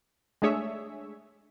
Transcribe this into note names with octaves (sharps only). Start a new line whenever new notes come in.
G#3 A3 D4 G#4 C#5 E5